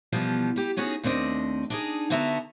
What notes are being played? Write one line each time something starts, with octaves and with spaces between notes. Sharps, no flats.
B2 E3 F3 G3 B3
G3 G4
B3 C#4 D#4 F#4 G#4
D#2 A3 C4 D4 D#5
D4 D#4 G#4
D3 B3 F#4 E5 A5 A#5